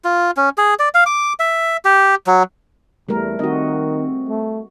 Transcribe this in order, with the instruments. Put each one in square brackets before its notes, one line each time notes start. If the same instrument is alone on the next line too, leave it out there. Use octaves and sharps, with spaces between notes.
[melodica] F4
C#4
G#4
D5
F5
D6
E5
G4
F#3
[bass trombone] E2 [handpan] G3 A3 A#4
[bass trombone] D#3 [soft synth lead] C4 [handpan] F#4 D#5
[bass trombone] A3